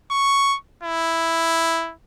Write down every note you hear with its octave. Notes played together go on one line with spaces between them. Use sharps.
C#6
E4